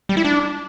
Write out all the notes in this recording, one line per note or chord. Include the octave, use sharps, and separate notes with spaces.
G3
E4
D4